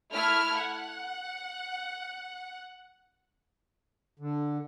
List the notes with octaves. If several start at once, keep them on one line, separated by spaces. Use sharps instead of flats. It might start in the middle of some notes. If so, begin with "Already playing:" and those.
A3 E4 F6 G#6
F#5
D3